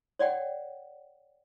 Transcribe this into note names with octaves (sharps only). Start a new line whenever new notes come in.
C#5 D5 F#5 G5